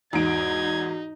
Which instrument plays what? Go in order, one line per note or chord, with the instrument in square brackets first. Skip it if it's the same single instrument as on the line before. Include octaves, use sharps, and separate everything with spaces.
[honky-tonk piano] E2 G#2 D7 [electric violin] D#4 [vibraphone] F#4 [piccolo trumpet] G#6